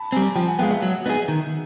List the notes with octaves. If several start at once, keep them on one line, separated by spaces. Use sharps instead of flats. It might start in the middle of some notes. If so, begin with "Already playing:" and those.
Already playing: A5 B5
G3 C4 G#5 A#5
F3 G5 A5
F#5 G#5
G#3 B3 F5 G5
E5 F#5
F#3
B3 D#4 G#4
D#3